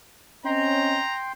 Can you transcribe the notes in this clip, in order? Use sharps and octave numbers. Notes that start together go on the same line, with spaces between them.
C4 C#4 D#5 G5 A#5 C6